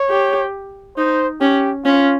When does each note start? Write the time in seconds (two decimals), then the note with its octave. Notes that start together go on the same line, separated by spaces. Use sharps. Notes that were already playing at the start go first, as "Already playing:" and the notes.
Already playing: C#5
0.09 G4
0.97 D#4 C5
1.41 C#4 G4
1.85 C#4 F4